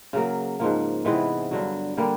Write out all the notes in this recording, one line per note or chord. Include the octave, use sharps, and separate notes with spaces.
C#3 F#3 A#3
G#2 F3 A#3
C3 E3 G#3 B3
G2 D3 F#3
D3 G3 A#3